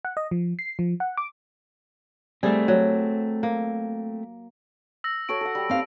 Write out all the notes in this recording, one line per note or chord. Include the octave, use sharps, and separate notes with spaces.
F#5
D#5
F3
C7
F3
F#5
D6
G3 A3 C4 G#4
F#3
A#3
E6 A#6
F#4 A4 C#5 D7
A4 F#5
G3 B5
C4 F5